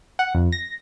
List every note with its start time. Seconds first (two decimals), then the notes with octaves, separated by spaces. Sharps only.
0.19 F#5
0.34 F2
0.52 A#6